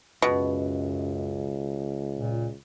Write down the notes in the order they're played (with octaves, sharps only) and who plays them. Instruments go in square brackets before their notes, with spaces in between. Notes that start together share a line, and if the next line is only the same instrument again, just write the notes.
[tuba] C#2 [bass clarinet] F#2 [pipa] B2
[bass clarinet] A#2